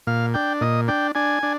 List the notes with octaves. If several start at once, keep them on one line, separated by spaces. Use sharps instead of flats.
A#2 F5
D4 G5
A#2 D#5
D4 G5
D4 G#5
D4